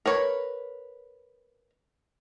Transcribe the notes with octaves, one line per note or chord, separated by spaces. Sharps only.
A#4 B4 C#5